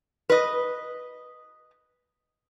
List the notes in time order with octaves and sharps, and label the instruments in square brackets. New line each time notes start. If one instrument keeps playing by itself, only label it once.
[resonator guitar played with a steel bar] B4 D#5